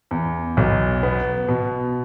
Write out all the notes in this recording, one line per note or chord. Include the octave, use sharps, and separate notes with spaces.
E2
B1
B3
B2